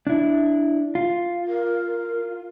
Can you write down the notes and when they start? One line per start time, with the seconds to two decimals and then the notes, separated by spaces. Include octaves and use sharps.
0.07 D4 E4
0.95 F4
1.48 A#4